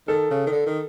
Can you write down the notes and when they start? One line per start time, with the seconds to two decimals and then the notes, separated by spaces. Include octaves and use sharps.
0.08 D#3 A4
0.31 C#3
0.47 D#3
0.52 D3
0.66 D#3